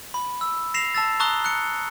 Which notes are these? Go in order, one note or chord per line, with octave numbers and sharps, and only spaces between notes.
B5
E6
A#6 C7 E7 F7
A5 E6 A6
A5 A#5 C#6 D#6 F#6 G7
F#6 C#7